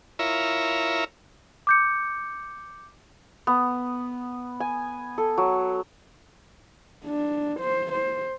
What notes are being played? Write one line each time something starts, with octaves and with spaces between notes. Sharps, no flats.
E4 F4 A#4 C#5 E5 A#5
D6 G6 C#7
B3
G#5
A4
F#3
D4
C5
C5